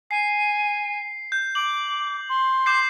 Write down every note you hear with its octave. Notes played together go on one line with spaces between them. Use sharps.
G#5 C7
G6
D6 F#7
C6
D6 G6 C7